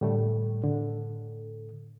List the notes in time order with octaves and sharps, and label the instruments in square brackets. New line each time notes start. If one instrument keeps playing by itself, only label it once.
[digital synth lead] A2 [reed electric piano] D3 G3 A3
[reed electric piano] D3